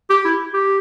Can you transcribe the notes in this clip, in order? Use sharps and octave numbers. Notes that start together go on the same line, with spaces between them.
G4
E4
G4